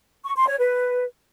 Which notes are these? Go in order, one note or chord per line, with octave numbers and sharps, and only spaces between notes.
C#6
C6
C#5
B4